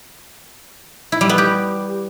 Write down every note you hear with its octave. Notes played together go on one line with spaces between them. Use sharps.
E4
G3
B3
G4